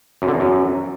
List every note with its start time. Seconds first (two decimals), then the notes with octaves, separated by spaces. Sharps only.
0.22 F#2
0.28 D3
0.34 E2
0.40 F#2